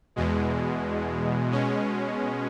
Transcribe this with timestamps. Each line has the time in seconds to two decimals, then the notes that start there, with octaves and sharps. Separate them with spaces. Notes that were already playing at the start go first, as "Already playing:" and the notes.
0.16 E2 B2 G#3
1.51 B2 G#3 C#4